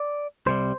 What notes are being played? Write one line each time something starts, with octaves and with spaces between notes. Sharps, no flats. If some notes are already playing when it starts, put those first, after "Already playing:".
Already playing: D5
C2 C3 G3 C5